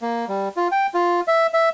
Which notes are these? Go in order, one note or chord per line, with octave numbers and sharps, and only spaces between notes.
A#3
G3
F4
G5
F4
E5
E5